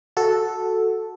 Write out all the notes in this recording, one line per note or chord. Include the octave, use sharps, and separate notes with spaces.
F#4 A4